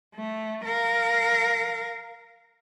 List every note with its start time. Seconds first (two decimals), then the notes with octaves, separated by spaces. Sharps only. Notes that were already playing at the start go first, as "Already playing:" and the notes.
0.16 A3
0.65 A#4 F5